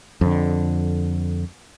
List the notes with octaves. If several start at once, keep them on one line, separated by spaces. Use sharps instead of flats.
F2 D3